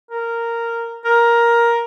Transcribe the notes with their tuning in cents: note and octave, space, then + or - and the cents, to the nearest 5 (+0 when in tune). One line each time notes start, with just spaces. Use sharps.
A#4 -10
A#4 +10